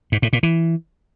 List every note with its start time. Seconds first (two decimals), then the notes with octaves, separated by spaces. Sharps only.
0.12 G#2
0.22 A2
0.33 A#2
0.43 E3